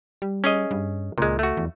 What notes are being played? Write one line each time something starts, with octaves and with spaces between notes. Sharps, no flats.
G3
C#4 G#4 D#5
G2
C#2 A#2 G#3
A3 F#4
E2